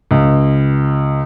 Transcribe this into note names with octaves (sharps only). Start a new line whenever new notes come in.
C#2